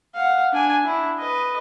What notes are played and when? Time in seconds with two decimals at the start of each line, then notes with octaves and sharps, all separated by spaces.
0.15 F5 F#5
0.53 D4 G#5
0.84 D4 E4
1.19 B4 D#5